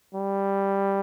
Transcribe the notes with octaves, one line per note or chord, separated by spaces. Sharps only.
G3